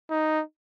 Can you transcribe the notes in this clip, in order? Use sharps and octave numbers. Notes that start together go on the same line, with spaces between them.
D#4